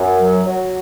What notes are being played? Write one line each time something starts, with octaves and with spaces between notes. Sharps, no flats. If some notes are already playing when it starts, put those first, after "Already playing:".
Already playing: F#2
F#3
F#3